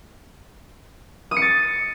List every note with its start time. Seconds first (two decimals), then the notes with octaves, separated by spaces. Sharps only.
1.31 D#6
1.37 C#7
1.42 A6